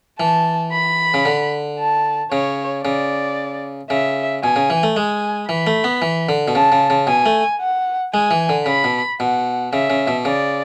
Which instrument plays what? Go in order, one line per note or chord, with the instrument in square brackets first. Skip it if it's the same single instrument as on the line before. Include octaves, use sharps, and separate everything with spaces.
[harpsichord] E3 [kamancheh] A5
[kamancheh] B5
[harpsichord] C#3
D3
[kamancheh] A5
[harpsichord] C#3 [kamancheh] C#5
[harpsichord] C#3 [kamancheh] D5
[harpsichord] C#3 [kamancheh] E5
[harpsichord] B2 [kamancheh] G#5
[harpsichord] C#3
E3
A3
[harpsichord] G#3 [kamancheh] G#5
[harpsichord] E3 [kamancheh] B5
[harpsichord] A3
B3
E3
D3
B2
[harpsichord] C#3 [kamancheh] A5
[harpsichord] C#3
C#3
[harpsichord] B2 [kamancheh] G#5
[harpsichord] A3
[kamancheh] F#5
[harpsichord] G#3 [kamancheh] G#5
[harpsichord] E3
D3
[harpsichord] C#3 [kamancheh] B5
[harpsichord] B2
[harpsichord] B2 [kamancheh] F#5
[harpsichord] C#3 [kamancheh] E5
[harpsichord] C#3
B2
[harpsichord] C#3 [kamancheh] D5